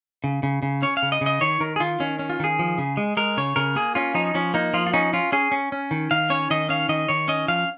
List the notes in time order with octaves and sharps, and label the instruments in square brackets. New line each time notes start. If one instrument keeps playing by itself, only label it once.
[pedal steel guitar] C#3
C#3
C#3
C#4 C#5
F5
C#3
D#5
C#3
D#5
D#3 C#5
D#3 A#4
G#4
D#3 F4
D#3 C#4
C#4
F4
D#3 G#4
F3
C#3
G#3
G#3 A#4
C#3 C#5
C#3 A#4
A#3 G#4
C#4 F4
F3 D#4
F3 C#4
A#3 D#4
F3 F4
F4
C#4 D#4
C#4 F4
C#4 G#4
C#4
C#4
D#3
D#3 F5
C#4 C#5
D#3 D#5
C#4 F5
D#3 D#5
D#3 C#5
C#4 D#5
F3 F5